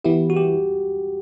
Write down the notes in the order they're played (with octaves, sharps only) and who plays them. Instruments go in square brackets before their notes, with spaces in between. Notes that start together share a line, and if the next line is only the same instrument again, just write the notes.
[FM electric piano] E3 B3 E4 [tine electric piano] G4
[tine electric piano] F#4
G4